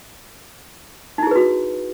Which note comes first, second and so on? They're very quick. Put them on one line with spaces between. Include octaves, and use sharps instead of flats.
D#4 E4 G#4 B4 F#4